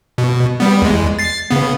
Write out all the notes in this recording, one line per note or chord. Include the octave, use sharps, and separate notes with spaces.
B2
G3 B3
E2 G#3
A6 C7
C#3 B3